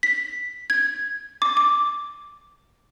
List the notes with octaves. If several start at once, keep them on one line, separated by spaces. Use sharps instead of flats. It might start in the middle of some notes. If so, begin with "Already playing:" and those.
B6
G#6
D6
D6